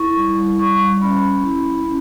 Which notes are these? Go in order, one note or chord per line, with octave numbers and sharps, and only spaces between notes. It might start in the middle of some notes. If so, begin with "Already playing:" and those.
Already playing: E4 C#6
G3
G3 C#6
C#4 B5
E4
C#4